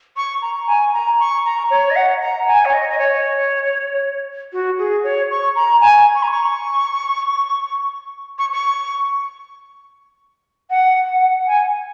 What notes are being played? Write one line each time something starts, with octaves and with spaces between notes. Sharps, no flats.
C#6
A#5
G#5
A#5
C#6
A#5
C#5
D#5
F#5
A#5
G#5
C#5
D#5
D#5
C#5
F#4
G#4
C#5
C#6
A#5
G#5
C#6
A#5
C#6
C#6
C#6
F#5
G#5